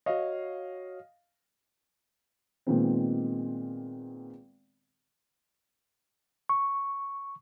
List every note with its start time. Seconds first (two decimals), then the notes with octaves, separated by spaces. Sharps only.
0.06 F#4 C#5 D#5 F5
2.67 A#2 D#3 G#3 B3 C4
6.49 C#6